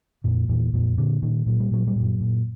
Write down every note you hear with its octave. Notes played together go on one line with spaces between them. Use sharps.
F2 A#2 F3
E2 A#2 E3
F2 A#2 F3
A#2 D3
A#2 D#3
A#2 F#3
G3
A#2 F#3
G3
F#2 A#2 F#3
A#2